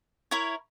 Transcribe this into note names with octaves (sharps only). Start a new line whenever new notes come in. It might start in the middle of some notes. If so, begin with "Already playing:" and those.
E4 A#4 C#5